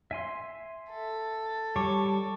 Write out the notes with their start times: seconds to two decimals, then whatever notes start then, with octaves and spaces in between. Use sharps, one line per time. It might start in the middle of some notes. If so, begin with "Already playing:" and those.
0.11 E5 G#5 C6
0.91 A4
1.76 G3 C#5 A5 C#6 D6